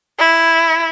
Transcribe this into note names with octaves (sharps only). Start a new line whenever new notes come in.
E4